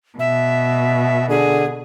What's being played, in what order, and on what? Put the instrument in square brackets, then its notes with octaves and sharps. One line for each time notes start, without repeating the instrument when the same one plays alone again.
[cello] B2 [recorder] E5
[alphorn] D3 [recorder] G#4